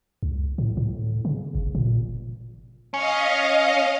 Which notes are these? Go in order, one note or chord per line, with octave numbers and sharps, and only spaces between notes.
C#2
A2
A2
C#3
G1
A#2
C#4 D#5 F5